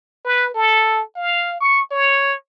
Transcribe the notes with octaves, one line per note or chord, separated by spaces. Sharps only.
B4
A4
F5
C#6
C#5